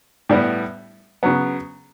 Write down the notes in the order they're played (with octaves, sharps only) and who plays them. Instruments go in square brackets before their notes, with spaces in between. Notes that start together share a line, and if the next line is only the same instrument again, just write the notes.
[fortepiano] A2 G3 B3
C#3 F#3 B3